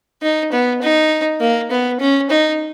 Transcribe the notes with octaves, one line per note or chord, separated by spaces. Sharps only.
D#4
B3
D#4
A#3
B3
C#4
D#4